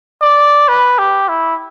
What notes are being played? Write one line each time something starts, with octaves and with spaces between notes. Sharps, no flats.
D5
B4
G4
E4